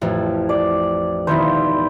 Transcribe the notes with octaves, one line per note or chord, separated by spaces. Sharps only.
A1 F2
D5
E1 D#3 E4 C5